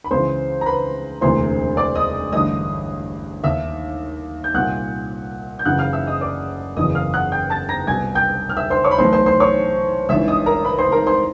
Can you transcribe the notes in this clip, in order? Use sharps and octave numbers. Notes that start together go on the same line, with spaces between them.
B5
C#2 C#3 E3 C5 C6
A#5
B4 B5
E1 D2 C3 E3 C5 C6
D5 D6
D#5 D#6
A1 G2 D3 D#5 D#6
D#2 D#3 E5 E6
G6
C2 A#2 F#5 F#6
G6
F#1 F#2 C#3 E3 F#5 F#6
F5 F6
E5 E6
D#5 D#6
D5 D6
F#1 E2 C#3 E3 D#5 D#6
F5 F6
F#5 F#6
G5 G6
A5 A6
A#5 A#6
C2 B2 G#5 G#6
G5 G6
F6
E5 E6
C5 C6
C#5 C#6
B5
B1 A2 E3 C5 C6
C5 C6
C5 C6
C#5 C#6
G#1 G2 E3 E5 E6
D#5 D#6
A#4 A#5
B4 B5
C5 C6
A#4 A#5
C5 C6